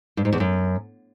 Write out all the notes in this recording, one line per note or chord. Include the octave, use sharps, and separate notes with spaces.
G2
G#2
E2
F#2